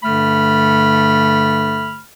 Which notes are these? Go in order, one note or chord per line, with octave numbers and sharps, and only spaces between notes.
G2 D3 A3 B5 F6